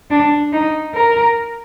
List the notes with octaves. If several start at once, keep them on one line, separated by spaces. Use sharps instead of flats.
D4
D#4
A#4